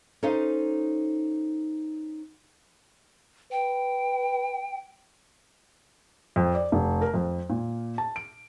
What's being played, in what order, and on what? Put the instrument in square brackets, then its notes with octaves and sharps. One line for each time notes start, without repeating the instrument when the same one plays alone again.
[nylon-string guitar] C#4 D#4 A4 C5 D#5 F5
[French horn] B4 [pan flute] G5
[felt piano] F2
D5
F1
A#4
F2
A#2
A5
D7